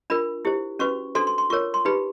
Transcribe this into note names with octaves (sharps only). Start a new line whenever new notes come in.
D4 F4 A#4 B5
E4 G4 C5
C#4 F#4 B4 C#6
D4 F#4 A4 C5 C6
C6
C6
F4 A#4 C#5 C#6
C6
D#4 G4 B4 B5